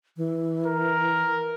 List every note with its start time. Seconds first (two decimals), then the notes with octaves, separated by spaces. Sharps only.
0.17 E3
0.66 A#4